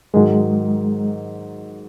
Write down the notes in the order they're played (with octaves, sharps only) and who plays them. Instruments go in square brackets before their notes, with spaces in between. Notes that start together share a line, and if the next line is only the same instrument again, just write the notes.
[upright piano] G#2 D#3 F#3 [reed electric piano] G#3